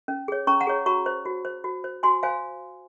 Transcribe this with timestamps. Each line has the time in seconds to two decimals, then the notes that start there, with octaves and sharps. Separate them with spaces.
0.08 C#4
0.28 G#4 C#5
0.47 C#4 A#5 C#6
0.61 F#5 A#5
0.67 G#4 C#5
0.86 F#4 A#5 C#6
1.06 C5
1.25 F#4
1.45 C5
1.64 F#4
1.84 C5
2.03 F#4 G#5 C6
2.23 C5 F5 G#5